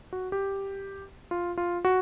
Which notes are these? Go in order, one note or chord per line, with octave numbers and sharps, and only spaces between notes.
F#4
G4
F4
F4
F#4